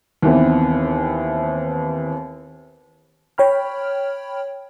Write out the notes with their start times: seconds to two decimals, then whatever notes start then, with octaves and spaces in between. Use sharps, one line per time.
0.22 D#2 E3 B3 C4
3.38 C#5 G5 B5 F6